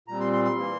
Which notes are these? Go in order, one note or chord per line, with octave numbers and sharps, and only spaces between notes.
A#2 G3 C4 A#5
C6
C6
C6
E3 A#3